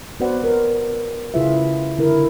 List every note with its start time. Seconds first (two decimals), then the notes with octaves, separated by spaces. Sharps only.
0.20 B3 F#4 B4 C5 D5 F#5
0.44 A#4
1.34 C#3 E4 F4 G#4 B4 E5
1.98 D3 E4 A#4